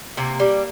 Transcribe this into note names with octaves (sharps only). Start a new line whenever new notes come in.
C3 A#3
G3